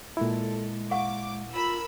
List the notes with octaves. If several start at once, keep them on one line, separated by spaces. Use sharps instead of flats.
A#2 G#3 E4 A4
F5 F#5 C#6 D6
F4 A#4 B5 E6